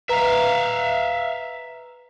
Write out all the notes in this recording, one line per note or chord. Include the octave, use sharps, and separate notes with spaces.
B4 E5 F5 A#5